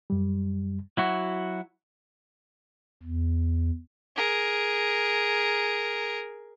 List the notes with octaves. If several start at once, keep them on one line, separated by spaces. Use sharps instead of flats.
F#2 G3
F#3 E4 F#4
E2
G#4 A#4